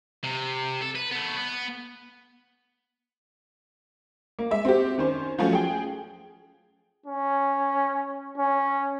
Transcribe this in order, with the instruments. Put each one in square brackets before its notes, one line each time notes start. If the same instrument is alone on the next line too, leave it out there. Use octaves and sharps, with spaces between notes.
[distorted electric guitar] C3
A4
B4
A3 B3
B3
[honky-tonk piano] A#3
G#3 E5
C4 F#4 G4
D#3 C#4 C5
F3 F#3 A3 C#4 F#4
G#4 G5
[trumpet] C#4
C#4